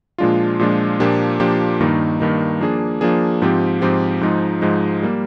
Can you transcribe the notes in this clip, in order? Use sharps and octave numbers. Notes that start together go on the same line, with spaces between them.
A#2 F3 G#3 D4 F4
A#2 F3 G#3 D4 F4
A#2 F3 A#3 D4 G4
A#2 F3 A#3 D4 G4
G2 D#3 A#3 D#4
G2 D#3 A#3 D#4
F3 A#3 D4 G#4
F3 A#3 D4 G#4
G#2 F3 C4 G4
G#2 F3 C4 G4
G#2 F3 G#3 D#4
G#2 F3 G#3 D#4
G3 A#3